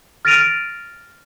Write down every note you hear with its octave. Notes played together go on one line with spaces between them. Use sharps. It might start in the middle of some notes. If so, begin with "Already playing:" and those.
F6 A6 A#6 D7 D#7 F7